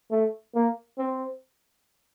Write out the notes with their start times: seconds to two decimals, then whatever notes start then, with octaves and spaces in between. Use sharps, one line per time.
0.11 A3
0.55 A#3
0.98 C4